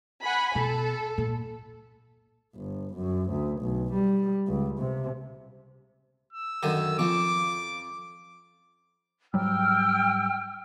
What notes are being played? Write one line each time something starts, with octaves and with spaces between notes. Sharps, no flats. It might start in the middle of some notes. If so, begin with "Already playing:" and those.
F#5 G#5 B5
B2 A4
A#2
G1
F#2
D2
B1
G3
C#2
C3
E6
F#2 D3 D#3 D#7
F2 F3 C#4 D6
G#2 F#3 G3 G5 E6 F6